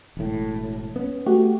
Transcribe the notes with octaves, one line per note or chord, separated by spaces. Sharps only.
E1 A2
B3 C#4
A3 F#4 G4